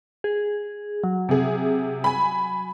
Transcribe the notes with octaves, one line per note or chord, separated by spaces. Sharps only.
G#4
F#3
C3 G#4
G#5 B5